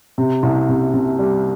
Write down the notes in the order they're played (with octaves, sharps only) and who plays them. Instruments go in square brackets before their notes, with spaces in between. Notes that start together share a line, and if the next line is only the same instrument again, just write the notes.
[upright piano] C3
C2
C3
C3
G3